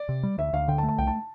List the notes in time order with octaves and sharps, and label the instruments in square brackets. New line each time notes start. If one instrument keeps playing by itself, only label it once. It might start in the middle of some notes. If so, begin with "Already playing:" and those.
Already playing: [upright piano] D5
[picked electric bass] C3
G3
[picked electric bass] D2 [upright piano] E5
[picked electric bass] D2 [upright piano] F5
[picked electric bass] D3 [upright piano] G5
[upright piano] A5
[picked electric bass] A3
[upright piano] A5
[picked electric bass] C2 [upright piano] G5
[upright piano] A5